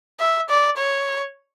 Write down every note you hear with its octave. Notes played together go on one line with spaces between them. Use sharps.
E5
D5
C#5